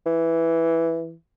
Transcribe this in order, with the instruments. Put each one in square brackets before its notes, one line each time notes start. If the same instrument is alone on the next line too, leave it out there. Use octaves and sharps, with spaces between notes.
[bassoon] E3